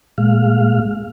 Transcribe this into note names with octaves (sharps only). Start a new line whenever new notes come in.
A#2 G#3 F5